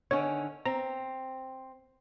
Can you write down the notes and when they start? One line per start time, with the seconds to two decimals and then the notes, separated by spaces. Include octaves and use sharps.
0.11 D3 D#3 C#4 C#5
0.65 C4 A#5